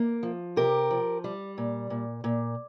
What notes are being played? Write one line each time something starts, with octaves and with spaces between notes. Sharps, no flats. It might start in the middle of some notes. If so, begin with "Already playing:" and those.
Already playing: A#3
F3
C3 G4 A#4
F3
G3
A#2
A#2
A#2